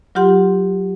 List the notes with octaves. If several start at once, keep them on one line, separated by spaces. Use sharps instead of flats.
F#3 F4 G4 F#5 C6